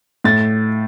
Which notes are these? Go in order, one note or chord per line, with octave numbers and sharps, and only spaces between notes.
A2 A6